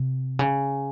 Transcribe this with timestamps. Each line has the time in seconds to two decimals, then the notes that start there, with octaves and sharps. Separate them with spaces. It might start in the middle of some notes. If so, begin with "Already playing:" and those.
Already playing: C3
0.39 C#3